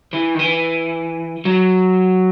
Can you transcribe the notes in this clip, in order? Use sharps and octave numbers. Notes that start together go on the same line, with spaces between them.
E3
D#3
E3
F#3